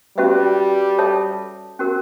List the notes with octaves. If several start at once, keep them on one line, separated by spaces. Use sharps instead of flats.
G3 C#4 F#4 B4 E5
A4 C#5 E5 A5
C#4 F#4 A#4